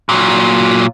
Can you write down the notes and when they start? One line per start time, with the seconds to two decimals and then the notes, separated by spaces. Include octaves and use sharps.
0.09 A#2 F#3